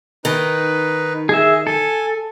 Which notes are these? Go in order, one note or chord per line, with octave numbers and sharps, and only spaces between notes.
D#3 D#4 B4
G#4 D#5 E5
A4 G#5